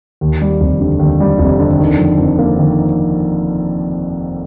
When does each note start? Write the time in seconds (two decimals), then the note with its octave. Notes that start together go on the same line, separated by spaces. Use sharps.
0.21 D#2
0.41 G3
0.61 F1
0.80 D3
0.99 D#2
1.20 G3
1.39 F1
1.60 D3
1.79 D#3
1.99 F2
2.18 F2
2.39 A#3
2.58 D#3